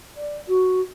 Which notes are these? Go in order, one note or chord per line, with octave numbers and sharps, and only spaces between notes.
D5
F#4